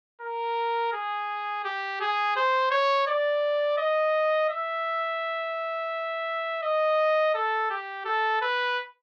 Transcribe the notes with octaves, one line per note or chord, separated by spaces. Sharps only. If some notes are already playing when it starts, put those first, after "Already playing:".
A#4
G#4
G4
G#4
C5
C#5
D5
D#5
E5
D#5
A4
G4
A4
B4